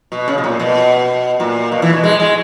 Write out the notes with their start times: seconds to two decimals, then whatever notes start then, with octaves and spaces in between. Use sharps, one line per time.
0.12 B2
0.28 C#3
0.38 B2
0.44 A#2
0.59 B2
1.40 A#2
1.72 B2
1.82 E3
1.93 B2
2.04 G#3
2.20 G#3